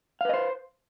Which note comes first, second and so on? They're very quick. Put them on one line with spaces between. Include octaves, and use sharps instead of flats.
F5 B4 D#5 C5